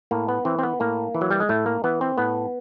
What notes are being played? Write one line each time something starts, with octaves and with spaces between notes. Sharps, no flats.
A2 A#3
B3
E3 C4
C4
B3
A2 A#3
E3
F#3
G3
G#3
A2 A3
A#3
E3 B3
C4
A2 B3